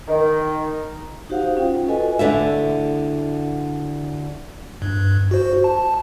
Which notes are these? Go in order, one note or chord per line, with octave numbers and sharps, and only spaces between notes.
D#3
D#4 F#4 G4 C5 F5 F#5
C#4 F4 G5
F#4 A4 B4 D#5 G#5
D2 D3 E4 E5
G2
F#4 C5
A5